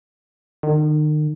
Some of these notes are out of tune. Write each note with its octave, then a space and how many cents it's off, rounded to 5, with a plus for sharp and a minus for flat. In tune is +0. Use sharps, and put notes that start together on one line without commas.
D#3 -40